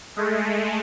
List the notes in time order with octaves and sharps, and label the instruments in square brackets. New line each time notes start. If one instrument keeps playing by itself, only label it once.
[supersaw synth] G#3 A3